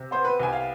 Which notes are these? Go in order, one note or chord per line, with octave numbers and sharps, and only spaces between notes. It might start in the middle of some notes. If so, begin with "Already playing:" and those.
Already playing: C3
B3 C5
B4
C2 G#5
F5